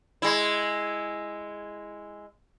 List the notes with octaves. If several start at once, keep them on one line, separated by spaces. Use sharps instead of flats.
G#3 E4